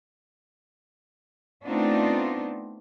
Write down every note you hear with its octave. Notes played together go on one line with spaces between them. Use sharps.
A3 B3 C4 D4 D#4 F4